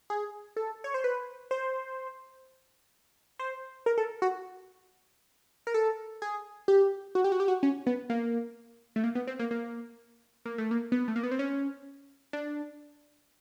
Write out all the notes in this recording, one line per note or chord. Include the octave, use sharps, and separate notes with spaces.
G#4
A4
C#5
C5
B4
C5
C5
A#4
A4
F#4
A#4
A4
G#4
G4
F#4
G4
F#4
G4
F#4
C#4
B3
A#3
A3
A#3
B3
C4
A#3
A#3
A#3
A3
A#3
B3
A3
A#3
B3
C4
C#4
D4